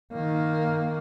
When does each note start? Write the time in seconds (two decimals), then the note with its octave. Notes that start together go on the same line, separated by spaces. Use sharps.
0.12 D#3 A#3